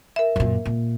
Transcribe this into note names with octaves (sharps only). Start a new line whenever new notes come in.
A#4 E5
F#2 A#2
A#2